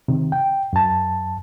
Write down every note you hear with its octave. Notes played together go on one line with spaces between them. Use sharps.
C3 D#3
G5
F#2 A5